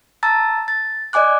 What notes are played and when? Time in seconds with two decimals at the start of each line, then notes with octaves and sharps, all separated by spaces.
0.23 A5 A#5 E6 A6
0.68 A6
1.13 D5 D#5 G#5 D6 F#6